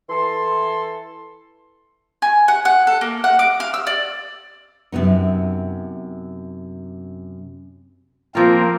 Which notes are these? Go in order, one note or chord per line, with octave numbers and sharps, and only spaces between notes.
E3 A4 C6
G#5
F#5
F#5
A4
A#3
F#5
D6
F5
E6
D5
F#2 C3 B3 D#4
F3 A#3 C4 F4 A#4